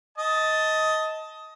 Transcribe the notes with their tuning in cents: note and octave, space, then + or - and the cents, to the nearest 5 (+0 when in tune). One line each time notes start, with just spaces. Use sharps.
D#5 +15 A5 +0